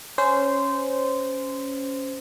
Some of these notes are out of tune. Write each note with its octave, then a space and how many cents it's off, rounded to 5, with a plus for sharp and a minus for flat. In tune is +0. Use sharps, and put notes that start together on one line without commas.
C#4 +0 C5 -15